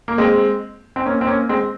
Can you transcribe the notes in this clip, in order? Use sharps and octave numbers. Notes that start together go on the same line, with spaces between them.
A#3
G#3 C4
C4
A#3 C#4
C4
A#3 C#4
G#3 C4